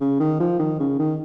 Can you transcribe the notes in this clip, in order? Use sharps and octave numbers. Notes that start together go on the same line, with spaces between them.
C#3
D#3
F3
D#3
C#3
D#3